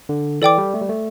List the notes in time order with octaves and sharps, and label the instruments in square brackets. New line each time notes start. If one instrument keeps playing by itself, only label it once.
[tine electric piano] D3
[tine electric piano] E3 [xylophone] A4 D5 G5 D6
[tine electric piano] G3
A3
G3
A3